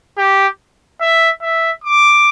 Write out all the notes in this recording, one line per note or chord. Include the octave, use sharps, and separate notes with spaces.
G4
E5
E5
D6